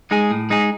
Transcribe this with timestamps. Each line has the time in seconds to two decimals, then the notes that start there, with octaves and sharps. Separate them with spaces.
0.11 G#3 D#4 G#4
0.31 A2
0.50 G#3 D#4 G#4